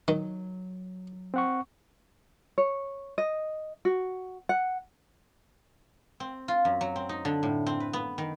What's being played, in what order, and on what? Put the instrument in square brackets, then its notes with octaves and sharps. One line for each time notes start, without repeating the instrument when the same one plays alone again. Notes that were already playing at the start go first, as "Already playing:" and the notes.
[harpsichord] D#3 [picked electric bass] F#3
[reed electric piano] C4 F#5 C#6
[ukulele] C#5
D#5
F#4
F#5
[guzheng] C4
F4
F#2
F#3
C4
D#4
D3
A2
C4
B4
B3
D#3